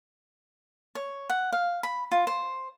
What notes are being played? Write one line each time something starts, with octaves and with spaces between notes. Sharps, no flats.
C#5
F#5
F5
B5
F4
C5